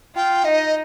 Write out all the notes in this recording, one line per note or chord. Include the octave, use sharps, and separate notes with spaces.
F4 G5
D#4 D#5